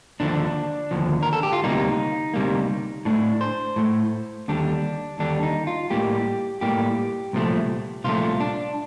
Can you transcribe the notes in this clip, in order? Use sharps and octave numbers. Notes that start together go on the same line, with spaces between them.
D#2 D3 F3 D4
D#2 D3 F3
A#4
A4
G4
F4
D2 C3 G3 A#3 D#4
D2 C3 G3 A#3
A2 A3 D4
C5
A2 A3
D#2 D3 G3 D4
D#2 D3 G3 D4
D#4
F4
A2 G3 A#3 G4
A2 G3 A#3 G4
C2 A#2 F3 A3
C2 A#2 F3 A3 F4
D4